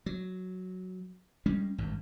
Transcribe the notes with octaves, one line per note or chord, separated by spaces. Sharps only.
F#3
G3 G#3 C#4
G#1 G2